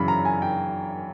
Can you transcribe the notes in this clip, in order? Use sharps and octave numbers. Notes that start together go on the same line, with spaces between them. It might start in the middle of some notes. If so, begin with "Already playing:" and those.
Already playing: F#2 C#3 E3 B5
A#5
G#5
G5